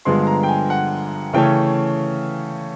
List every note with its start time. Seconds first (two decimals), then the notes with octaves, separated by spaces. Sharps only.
0.05 G2 D3 F3 G#3 B3 C6
0.27 A#5
0.43 G5
0.48 G#5
0.70 F#5
1.33 C#3 E3 A3 C#4 G5